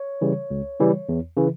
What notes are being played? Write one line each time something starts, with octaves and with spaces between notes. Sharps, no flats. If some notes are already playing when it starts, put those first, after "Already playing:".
Already playing: C#5
C#3 E3 G3
C#2
C#3 E3 G3
E2
C#3 E3